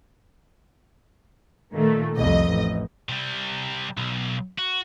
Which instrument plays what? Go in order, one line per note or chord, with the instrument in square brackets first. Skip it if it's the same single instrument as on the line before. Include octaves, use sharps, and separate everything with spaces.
[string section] A#2 D#3 A3
[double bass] C2 F2 [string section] D#5
[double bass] A1
[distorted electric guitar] C3 G3
B1
F#4